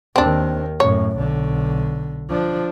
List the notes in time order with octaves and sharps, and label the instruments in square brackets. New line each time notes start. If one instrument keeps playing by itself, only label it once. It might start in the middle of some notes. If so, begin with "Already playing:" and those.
[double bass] D#2 D#3 [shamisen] C4 D4
[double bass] F#2 A2 [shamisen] C#5
[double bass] B1 D3
F3 D4